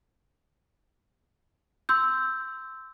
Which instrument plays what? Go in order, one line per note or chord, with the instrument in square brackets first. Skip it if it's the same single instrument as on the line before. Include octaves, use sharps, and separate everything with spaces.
[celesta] C6 E6 G6